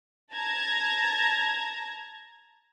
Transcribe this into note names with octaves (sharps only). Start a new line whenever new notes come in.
A5 A#5 G#6 A#6